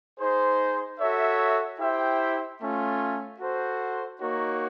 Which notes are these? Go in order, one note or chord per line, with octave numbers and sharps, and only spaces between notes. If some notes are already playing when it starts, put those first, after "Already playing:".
D#4 G#4 C5
F#4 A4 C#5 E5
E4 G4 C5 E5 G5
A3 C#4 F4
F#4 A4 C5
A#3 D#4 F#4 A#4 C#5